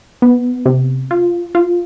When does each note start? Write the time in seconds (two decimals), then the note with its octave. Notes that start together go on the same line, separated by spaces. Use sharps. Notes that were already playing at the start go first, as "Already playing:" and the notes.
0.22 B3
0.66 C3
1.11 F4
1.55 F4